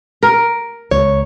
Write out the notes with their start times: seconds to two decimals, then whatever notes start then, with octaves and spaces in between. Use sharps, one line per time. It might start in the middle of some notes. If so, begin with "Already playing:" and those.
0.23 A#4
0.91 C#2 C#5